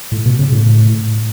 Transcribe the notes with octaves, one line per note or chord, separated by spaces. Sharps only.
A2
B2
C#3
A2